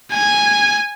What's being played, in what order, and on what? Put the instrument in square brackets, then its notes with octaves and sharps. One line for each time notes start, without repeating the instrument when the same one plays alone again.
[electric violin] G#5